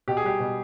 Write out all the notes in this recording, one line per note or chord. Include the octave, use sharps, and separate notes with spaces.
B2 G4
G#4
G3 G4
B2